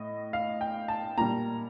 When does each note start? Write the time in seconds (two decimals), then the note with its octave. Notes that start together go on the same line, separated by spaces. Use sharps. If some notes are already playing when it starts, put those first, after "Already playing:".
Already playing: A2 D#5
0.33 F5
0.61 G5
0.88 A5
1.18 A#2 G3 A#5